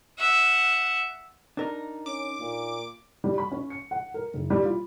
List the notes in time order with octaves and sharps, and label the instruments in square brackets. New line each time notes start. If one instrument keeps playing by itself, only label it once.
[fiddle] E5 F#5
[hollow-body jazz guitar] D4 D#4 A#4
[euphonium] C#4 [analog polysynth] D6
[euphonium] A#2
[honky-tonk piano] G3
B5
C#4
C#7
F#5
A#4
F#1
G3
F4